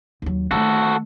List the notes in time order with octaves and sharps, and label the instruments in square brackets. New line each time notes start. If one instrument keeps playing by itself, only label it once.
[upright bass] D#2 F#3
[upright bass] D#3 A3 [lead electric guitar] F#4 A4